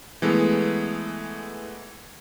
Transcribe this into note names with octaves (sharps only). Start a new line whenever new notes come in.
E3 G#3 A3 B3